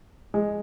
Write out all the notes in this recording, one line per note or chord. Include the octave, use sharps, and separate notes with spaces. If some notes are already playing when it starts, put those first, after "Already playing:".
G#3